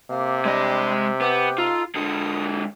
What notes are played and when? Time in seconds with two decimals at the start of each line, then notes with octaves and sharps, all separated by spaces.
0.10 C3 A#3
0.46 G3 G#3 D4 D#5
1.21 B3 G4 G5
1.58 D#4 F4 A4
1.96 D3 G#3 D#6